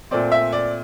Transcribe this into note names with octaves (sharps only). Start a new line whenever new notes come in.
A#2 A3 C4 D5
E5
D5